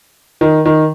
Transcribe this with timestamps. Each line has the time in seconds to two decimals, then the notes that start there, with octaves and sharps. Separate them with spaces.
0.41 D#3
0.65 D#3